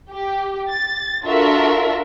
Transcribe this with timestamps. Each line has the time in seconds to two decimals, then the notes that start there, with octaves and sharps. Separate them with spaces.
0.10 G4
0.71 A6
1.25 D4 F4 F#4 A4 A#4 E5